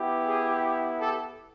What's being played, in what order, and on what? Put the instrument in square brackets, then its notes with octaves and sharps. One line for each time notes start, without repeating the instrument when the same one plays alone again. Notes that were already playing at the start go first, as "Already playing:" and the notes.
Already playing: [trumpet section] B3 E4 G4
G#4
G4 A4